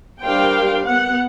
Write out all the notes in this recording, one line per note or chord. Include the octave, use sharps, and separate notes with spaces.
G3 D4 A#4 C5 F5 G5
B3 F#5